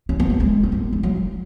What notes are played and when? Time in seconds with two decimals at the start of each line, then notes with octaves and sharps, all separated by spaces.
0.09 C#4
0.20 B3
0.30 F#3
0.40 G#3
0.63 C#4
0.72 B3
0.93 G#3
1.03 F#3